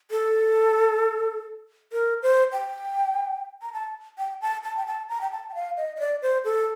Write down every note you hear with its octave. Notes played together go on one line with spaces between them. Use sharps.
A4
A#4
C5
G5
A#5
A5
G5
A5
A5
G5
A5
A#5
G5
A5
G5
F5
D#5
D#5
D5
C5
A4